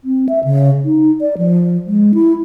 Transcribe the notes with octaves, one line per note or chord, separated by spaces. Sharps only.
C4
E5
C#3
D#4
D5
F3
G#3
E4